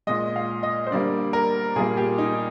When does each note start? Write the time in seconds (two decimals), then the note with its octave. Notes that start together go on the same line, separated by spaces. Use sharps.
0.07 A#2 G#3 D#5
0.36 F5
0.63 D#5
0.87 C5
0.91 D3 G3 A#3 D5
1.33 A#4
1.76 A#2 G3 A#3 G#4
1.97 G4
2.18 D#4